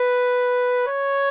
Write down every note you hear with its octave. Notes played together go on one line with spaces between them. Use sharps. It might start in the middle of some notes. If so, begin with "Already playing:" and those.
Already playing: B4
C#5